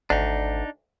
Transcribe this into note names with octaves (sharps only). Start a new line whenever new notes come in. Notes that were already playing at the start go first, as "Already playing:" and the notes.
G#1 D2 D4 D#4